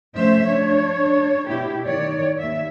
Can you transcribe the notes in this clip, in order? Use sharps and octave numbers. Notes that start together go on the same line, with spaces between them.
F3 A3 C#4 C5 E5
D4 C#5
B2 E4 G4
D#3 C#5 D5
D#2 E5